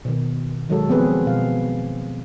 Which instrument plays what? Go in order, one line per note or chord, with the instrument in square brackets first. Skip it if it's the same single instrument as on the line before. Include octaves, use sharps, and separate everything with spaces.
[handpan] B2 D#3
D#3 F#3 G#3 F#4 A4
F3 B3 C4 G#4 B4
B2 F5